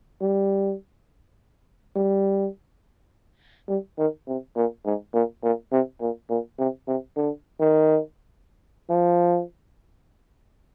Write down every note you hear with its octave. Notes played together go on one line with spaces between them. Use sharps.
G3
G3
G3
D#3
C3
A#2
G#2
A#2
A#2
C3
A#2
A#2
C3
C3
D3
D#3
F3